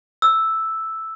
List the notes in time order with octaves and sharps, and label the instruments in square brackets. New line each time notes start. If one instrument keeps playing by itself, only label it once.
[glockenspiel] E6